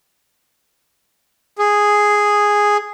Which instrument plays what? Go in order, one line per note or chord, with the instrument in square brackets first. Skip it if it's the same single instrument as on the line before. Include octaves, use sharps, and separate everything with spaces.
[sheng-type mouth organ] G#4